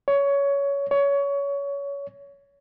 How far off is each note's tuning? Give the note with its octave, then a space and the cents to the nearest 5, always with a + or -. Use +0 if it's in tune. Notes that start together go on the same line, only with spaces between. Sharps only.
C#5 +15
C#5 +20